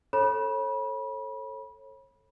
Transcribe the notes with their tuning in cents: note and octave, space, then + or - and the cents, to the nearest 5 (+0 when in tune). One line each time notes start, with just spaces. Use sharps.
A4 +0 C#5 -40 B5 -30